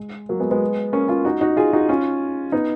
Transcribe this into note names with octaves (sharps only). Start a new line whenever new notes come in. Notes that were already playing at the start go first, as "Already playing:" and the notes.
Already playing: G#3
F#3 A#3
G#3 B3
G#3 B3
A#3 C#4
C#4 F4
D#4 F#4
D#4 F#4
F4 G#4
D#4 F#4
C#4 F4
B3 D#4